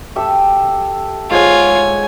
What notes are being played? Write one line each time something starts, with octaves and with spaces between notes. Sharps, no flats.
G4 A4 E5
G#2 F4 C#5 F#5 G#5